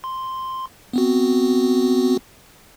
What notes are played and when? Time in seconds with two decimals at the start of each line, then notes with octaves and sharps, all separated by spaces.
0.04 C6
0.93 B3 C4 F#4